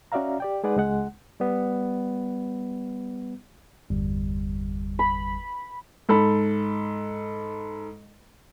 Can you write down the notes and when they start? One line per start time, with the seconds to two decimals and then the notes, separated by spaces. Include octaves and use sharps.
0.12 C#4 F#4 D5 E5 F5 A#5
0.40 G4 D5 G5
0.64 G#3 D#4 G#4 B4 D5 F#5
0.76 C#2 G#3 F#5
1.40 G3 B3
3.90 G1 E2 G3
4.99 B5
6.09 G#2 A4 B5